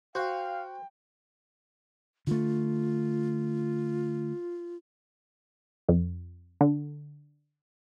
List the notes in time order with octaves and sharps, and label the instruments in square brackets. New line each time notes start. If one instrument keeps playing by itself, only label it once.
[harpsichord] F#4 [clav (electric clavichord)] C5 [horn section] F5 [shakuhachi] G5
[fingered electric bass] D3 A3 [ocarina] F4
[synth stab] F2
D3